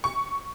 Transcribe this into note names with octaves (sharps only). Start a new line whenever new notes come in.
C#6